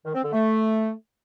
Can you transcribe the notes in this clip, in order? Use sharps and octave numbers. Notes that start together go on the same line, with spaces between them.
D#3
C4
D3
A3